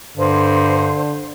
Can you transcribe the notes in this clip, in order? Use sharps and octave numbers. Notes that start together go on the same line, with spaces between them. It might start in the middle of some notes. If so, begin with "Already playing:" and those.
G2 D3 C5